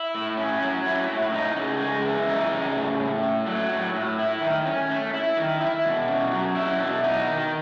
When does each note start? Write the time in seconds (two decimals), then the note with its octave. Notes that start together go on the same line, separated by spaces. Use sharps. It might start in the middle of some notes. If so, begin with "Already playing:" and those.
Already playing: E4
0.15 A2
0.37 C#4
0.62 F#3
0.86 E4
1.09 A2
1.32 D#4
1.57 C#3
1.80 G#3
2.04 E3
2.29 D#4
2.51 C#3
2.75 A2
3.00 A2
3.23 A3
3.46 F#3
3.70 A2
3.94 A2
4.19 E4
4.41 D#3
4.66 C#4
4.90 A3
5.14 E4
5.37 D#3
5.61 E4
5.85 B2
6.08 C#4
6.32 F#3
6.55 E4
6.79 B2
7.04 D#4
7.27 D#3